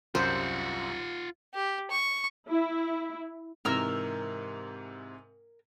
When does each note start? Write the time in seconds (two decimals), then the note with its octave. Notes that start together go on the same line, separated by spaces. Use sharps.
0.15 C2 F#2 G3 F4 C5 F#5
1.54 G4
1.90 C#6
2.49 E4
3.65 G#2 C3 E3 A#4 E6